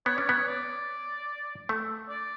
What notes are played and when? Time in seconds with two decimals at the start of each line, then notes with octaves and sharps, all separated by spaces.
0.06 B3 C#5
0.16 C#4 D5
0.26 B3 C#5
0.47 D5
1.69 A3
2.09 D5